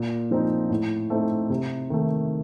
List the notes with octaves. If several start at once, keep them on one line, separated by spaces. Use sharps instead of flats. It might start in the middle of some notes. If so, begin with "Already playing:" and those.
Already playing: A#2
F3 C4 D#4
A2
A3 C4 D#4
C3
D#3 A3